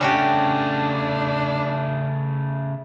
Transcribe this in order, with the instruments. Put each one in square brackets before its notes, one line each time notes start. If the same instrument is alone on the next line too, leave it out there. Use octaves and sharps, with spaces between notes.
[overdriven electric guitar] C#3 A3 [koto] C#4 F#4 G4 [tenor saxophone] D4